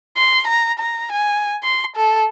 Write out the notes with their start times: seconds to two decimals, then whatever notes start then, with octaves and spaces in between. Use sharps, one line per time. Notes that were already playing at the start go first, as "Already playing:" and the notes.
0.17 C6
0.47 A#5
0.79 A#5
1.12 G#5
1.64 C6
1.96 A4